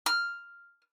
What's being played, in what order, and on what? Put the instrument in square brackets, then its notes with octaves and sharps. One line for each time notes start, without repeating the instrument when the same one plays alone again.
[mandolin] F6